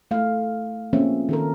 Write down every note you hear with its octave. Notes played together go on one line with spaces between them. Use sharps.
A3 E4 F5
F3 A#3 C4 C#4 G#4 E5
D#3 A4 A#4